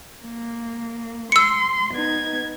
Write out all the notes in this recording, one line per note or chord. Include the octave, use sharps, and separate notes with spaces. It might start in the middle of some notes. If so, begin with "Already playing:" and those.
A#3
C6 E6 C#7
B3 D#4 G#6